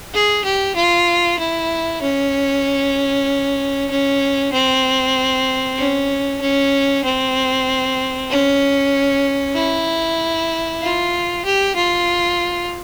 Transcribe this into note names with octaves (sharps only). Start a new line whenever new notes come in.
G#4
G4
F4
E4
C#4
C#4
C4
C#4
C#4
C4
C#4
E4
F4
G4
F4